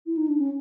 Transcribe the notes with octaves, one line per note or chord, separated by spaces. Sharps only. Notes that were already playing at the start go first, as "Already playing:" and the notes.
E4
D#4
D4
C#4